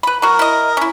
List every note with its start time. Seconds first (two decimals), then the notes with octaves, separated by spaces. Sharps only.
0.03 B4 B5
0.22 F#3 F#4 A#4
0.39 E4 D#5
0.77 C#4 E4